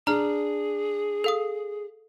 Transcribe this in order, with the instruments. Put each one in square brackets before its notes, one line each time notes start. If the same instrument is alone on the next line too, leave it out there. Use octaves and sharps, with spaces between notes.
[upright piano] D4 [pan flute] G#4 [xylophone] A#5 F6
[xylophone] A4 F5 D#6